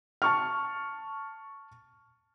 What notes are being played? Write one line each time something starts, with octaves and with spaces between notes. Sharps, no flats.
A5 C#6 F6